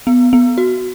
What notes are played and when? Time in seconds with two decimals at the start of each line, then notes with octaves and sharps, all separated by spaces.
0.07 B3
0.33 B3
0.58 F#4